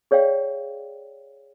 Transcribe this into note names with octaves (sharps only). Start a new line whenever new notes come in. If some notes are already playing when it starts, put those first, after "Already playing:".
G#4 C#5 D5 F5 G5